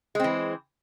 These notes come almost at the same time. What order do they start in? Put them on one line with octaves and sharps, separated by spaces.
G#3 C4 E3